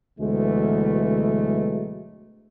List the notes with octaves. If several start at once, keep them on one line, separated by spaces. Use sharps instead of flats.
D2 B2 E3 F#3 G#3 A3